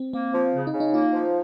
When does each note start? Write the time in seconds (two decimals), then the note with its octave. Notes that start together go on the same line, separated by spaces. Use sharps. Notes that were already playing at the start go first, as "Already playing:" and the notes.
Already playing: C4
0.13 A#3 C4
0.33 F3
0.54 C#3
0.67 D#4
0.73 C#3
0.80 D#4
0.93 A#3 F4
1.13 F3